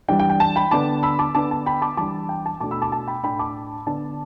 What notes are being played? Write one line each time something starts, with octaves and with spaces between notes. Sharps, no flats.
E3 G3 D4 G5
G5
G5
A5
G5 B5
D3 B3 D4 A5 D6
B5 E6
A5 D6
D3 B3 D4 A5 D6
A5
G5 B5
A5 D6
E3 G3 D4 A5 D6
G5
A5
B2 A3 D4 A5 D6
B5 E6
A5 D6
A5
G5 B5
A2 A3 D4 G5 B5
A5 D6
D3 B3 D4 A5